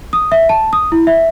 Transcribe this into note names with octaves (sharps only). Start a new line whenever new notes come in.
D#6
E5
A5
D#6
E4
E5